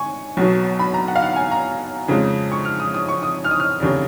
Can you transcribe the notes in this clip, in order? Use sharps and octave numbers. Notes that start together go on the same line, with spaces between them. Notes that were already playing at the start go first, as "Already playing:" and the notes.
Already playing: G#5 C#6
B1 B2 F#3
B5
A#5
F#5
F5
F#5
G#5
A#5
F2 C#3 F3 G#3
C#6
F6
D#6
D#6
C#6
D#6
F6
D#6
F6
F1 D#2 C#3